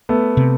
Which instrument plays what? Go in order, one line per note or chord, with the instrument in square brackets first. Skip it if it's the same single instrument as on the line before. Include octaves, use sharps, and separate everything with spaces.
[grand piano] A3 B3
[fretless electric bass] C3